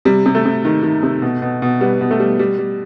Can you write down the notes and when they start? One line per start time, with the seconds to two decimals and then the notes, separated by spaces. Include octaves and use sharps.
0.05 C3 G3
0.26 C3
0.35 A3
0.45 C3
0.65 D#3
0.83 D#3
1.03 C3
1.22 B2
1.42 B2
1.62 B2
1.81 G3 B3
2.01 B2
2.11 A3
2.20 G3
2.39 G3
2.58 G3